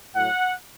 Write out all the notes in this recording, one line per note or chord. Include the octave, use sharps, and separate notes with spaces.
A2 F#3 F#5